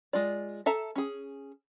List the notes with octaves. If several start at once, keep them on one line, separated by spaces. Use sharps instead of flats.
G#3 F4 D5
A4 E5 A5 A#5
C#4 G#4